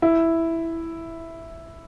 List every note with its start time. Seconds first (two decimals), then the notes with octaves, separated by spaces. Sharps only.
0.02 E4